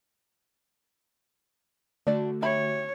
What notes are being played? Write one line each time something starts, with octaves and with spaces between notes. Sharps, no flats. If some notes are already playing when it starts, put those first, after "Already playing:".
D3 A3 D4 F#4 D5
G4 C#5 E5 B5